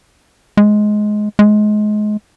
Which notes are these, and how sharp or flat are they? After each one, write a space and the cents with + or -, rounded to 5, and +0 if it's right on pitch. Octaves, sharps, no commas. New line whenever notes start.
G#3 +15
G#3 +25